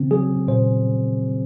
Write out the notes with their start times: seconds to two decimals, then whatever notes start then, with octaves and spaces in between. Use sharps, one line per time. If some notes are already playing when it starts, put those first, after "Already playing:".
Already playing: C#3 C4
0.11 F#3 G#4
0.48 A#2 C5